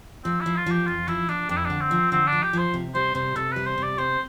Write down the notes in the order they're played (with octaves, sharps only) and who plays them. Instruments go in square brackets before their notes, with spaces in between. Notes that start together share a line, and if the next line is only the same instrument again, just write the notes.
[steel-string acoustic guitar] F3 [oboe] C4
[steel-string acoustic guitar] F3 [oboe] E4
[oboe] F4
[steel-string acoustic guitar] F3
[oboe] G4
[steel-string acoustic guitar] F2 [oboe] F4
[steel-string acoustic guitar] F3 [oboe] E4
[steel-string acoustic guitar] F3 [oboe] D4
[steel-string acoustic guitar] F2 [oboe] D4
[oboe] E4
[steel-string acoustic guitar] D3 [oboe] D4
[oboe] C4
[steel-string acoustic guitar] F3
[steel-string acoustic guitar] D3 [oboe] C4
[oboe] D4
[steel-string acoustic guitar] F3
[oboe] G4
[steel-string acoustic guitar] F3 [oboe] C5
[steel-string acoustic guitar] C3
[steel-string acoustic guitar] G3 [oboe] C5
[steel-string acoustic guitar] C3 [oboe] C5
[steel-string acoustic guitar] C3 [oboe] A4
[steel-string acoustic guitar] G3 [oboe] B4
[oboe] C5
[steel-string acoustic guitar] C3
[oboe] D5
[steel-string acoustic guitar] C4 [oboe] C5